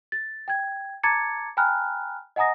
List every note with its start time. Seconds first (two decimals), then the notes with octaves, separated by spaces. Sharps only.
0.12 A6
0.48 G5 G#6
1.03 A5 A#5 D6 G#6 A6 C#7
1.57 G5 G#5 A#5 B5 F6 F#6
2.36 D#5 F#5 G#5 A#5 D#6 A#6